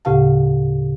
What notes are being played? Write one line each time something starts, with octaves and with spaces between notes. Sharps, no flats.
D2 A2 C#3 G4 F5 A5